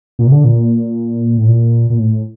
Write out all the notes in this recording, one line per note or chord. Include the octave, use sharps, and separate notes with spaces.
A#2
C3
D3
A#2
A2
A#2
A#2
A2